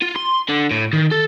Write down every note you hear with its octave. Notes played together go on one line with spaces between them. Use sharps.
F4
C6
D3
A2
D#3
A4